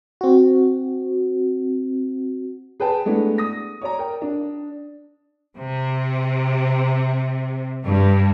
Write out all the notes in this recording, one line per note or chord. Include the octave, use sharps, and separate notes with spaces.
C4 F#4
G#4 B4 G5 A5
G#3 A3 B3 D4 E4
D#6 A#6
C#5 D5 A#5
A#4 G5
D4
C3
G2